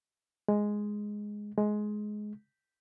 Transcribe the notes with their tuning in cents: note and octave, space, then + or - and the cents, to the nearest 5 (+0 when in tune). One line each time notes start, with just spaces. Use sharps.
G#3 +0
G#3 +15